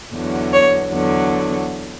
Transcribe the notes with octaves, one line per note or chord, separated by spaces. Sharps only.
E2 D3 F#3
C#5
E2 D3 F#3